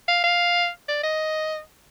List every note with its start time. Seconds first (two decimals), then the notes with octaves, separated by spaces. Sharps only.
0.08 F5
0.24 F5
0.88 D5
1.03 D#5